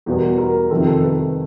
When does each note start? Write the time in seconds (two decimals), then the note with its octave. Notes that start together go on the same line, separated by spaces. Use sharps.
0.06 E2 B2 G3 B3 A#4
0.38 A#4
0.70 F2 C3 D#3 A4
0.87 A4
1.02 B4